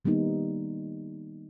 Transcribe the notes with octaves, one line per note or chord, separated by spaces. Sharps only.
D#3 G3 A#3 B3 D#4